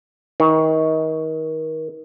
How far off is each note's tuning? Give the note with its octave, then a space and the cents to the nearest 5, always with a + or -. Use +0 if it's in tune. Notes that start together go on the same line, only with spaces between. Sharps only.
D#3 +30